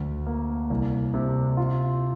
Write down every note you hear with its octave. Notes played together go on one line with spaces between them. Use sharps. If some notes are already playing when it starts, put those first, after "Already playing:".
Already playing: D2
A#3
C2
C3
F4